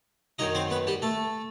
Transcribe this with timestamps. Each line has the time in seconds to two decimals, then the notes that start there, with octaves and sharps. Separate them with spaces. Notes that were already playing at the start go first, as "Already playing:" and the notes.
0.39 F#2 D#3 F#3 D#4 D#5
0.55 C4 C5
0.70 B3 B4
0.87 G3 G4
1.02 A3 A4